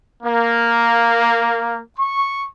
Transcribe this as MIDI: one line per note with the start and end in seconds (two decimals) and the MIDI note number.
0.23 1.78 58
1.97 2.47 85